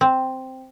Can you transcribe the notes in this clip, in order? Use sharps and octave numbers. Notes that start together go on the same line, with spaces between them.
C4